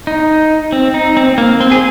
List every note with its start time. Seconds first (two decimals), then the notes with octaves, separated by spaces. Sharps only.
0.07 D#4
0.72 C4
0.94 D#4
1.17 C4
1.38 A#3
1.60 C4
1.72 G#4